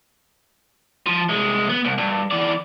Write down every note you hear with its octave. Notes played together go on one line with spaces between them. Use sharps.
F3
C2 G#3
B3
C2
G2
E3 D5